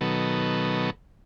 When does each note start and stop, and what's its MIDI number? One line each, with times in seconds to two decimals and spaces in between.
0.01 0.90 47
0.01 0.90 51
0.01 0.90 54
0.01 0.90 59
0.01 0.90 69